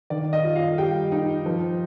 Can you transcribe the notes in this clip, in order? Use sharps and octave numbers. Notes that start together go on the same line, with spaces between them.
D#3 D5
D#5
F4
F5
G3 G5
D#4
F3